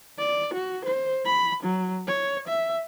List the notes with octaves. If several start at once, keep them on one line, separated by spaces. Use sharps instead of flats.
D5
F#4
C5
B5
F#3
C#5
E5